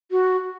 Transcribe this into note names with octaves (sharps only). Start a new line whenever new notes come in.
F#4